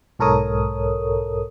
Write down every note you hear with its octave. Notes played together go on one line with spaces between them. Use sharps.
B1 G#2 A4 A#4 C#5 D#6